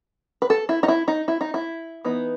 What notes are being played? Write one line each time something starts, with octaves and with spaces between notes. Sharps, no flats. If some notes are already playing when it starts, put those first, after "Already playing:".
B4
A4
E4
D#4
E4
D#4
E4
D#4
E4
E3 B3 D#4